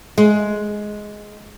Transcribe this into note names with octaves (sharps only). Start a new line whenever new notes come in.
G#3